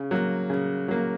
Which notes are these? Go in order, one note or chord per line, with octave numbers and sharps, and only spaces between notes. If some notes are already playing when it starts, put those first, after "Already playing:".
Already playing: C#3
F#3 A#3
C#3
F#3 A#3